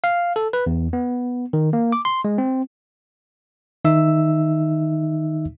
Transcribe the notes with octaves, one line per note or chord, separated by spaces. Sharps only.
F5
A4
B4
E2
B3
D#3
A#3
D6
C6
G#3
C4
D#3 D#4 E5 E6